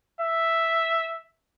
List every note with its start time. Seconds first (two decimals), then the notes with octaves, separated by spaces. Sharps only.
0.21 E5